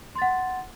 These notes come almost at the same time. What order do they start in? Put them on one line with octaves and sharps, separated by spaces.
C6 A6 F#5